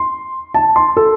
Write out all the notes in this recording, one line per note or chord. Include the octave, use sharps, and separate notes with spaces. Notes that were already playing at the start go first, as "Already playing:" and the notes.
Already playing: C6
A5
C6
A4